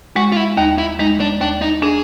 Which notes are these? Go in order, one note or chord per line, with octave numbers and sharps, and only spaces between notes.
G#3 F#4
F4
E4
D#2 D#4
E4
G#3 D#4
D4
D#2 D4
D#4
D4 G#4